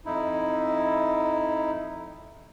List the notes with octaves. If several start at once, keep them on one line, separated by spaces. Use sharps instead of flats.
F2 D#4 E4